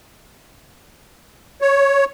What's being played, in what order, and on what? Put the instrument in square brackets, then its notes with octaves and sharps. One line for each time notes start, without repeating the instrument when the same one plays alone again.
[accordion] C#5